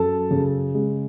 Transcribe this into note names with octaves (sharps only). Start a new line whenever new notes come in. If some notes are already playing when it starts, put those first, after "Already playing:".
Already playing: F#2 A4 A5
C#3
G#3